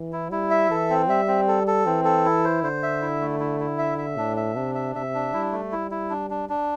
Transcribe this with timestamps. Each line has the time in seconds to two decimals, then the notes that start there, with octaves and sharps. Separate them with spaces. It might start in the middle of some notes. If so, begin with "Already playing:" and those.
Already playing: E3
0.13 E4
0.31 G3 E4
0.51 E5
0.71 E3 A4
0.90 C4
1.09 G3 E5
1.28 C4
1.48 A4
1.67 A4
1.86 E3 C4
2.05 A4
2.25 E4
2.44 C5
2.63 D3 C5
2.83 E5
3.02 E4
3.21 A3
3.40 E4
3.60 E4
3.78 E5
3.98 E5
4.18 A2 D4
4.37 E5
4.56 C3 D4
4.75 E5
4.95 C3 E5
5.14 D4
5.34 G3 E4
5.52 A3
5.72 E4
5.91 E4
6.10 D4
6.30 D4
6.49 D4